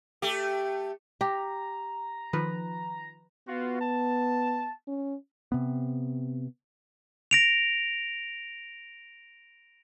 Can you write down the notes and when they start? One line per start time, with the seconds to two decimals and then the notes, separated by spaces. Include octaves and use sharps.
0.22 A3 G4
1.21 G4 A#5
2.33 D#3 F3 B4
3.48 B3 F4 F#4
3.81 A5
4.87 C#4
5.52 C3 B3
7.31 A#6 D7 F7